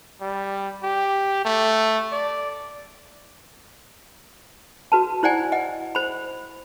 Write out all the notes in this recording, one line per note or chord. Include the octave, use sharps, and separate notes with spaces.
G3
G4
A3
D5
F#4 B4 A5
E4 C5 D5 F#5 G#5
D#5 F#5
C5 B5